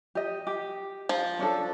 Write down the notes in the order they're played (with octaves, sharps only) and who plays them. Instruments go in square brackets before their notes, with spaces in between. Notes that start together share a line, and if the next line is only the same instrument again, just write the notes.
[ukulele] G4 D#5
G4
[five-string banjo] F3
[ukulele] C#4 D4 A4